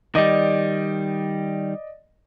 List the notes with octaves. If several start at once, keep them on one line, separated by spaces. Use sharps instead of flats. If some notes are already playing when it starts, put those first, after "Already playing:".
D#3 G3 D5 D#5